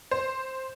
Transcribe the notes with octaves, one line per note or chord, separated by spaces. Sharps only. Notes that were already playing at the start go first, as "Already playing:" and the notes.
C5